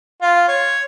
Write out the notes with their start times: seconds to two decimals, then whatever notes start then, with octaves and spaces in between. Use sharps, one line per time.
0.22 F4
0.48 C#5